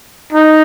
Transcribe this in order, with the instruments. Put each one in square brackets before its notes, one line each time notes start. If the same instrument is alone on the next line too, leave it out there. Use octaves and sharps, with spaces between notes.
[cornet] D#4